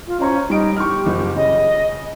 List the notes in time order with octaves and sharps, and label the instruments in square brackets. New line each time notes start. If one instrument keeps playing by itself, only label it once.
[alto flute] F4
[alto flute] C#4 [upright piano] C5 A#5 C#6
[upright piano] G3 D7 [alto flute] D#4
[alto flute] G4 [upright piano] C#6 F6
[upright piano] F#1 F4
[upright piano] C#3 [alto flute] D#5